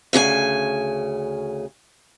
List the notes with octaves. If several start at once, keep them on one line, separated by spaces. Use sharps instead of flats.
D2 C#3 G#4 G#5